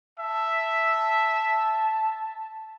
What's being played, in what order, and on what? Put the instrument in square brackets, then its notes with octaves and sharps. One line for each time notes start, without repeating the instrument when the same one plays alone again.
[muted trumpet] E5 [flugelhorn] A5